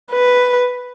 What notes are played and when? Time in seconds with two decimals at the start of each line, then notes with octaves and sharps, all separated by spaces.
0.11 B4